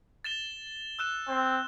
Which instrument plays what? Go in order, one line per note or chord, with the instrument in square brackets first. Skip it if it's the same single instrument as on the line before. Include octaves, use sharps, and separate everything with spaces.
[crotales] A6 E7 G7
E6 F#6 E7
[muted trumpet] C4